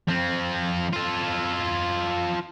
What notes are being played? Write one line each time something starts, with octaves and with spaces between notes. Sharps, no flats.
F3 C4
F4 A4